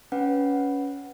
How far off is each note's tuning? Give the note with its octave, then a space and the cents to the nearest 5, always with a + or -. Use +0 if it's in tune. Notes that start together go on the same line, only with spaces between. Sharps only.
C#4 +20 B4 +0 F#5 +0